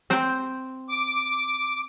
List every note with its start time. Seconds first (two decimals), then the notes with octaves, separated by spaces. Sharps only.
0.10 C4 C5 G5
0.89 D6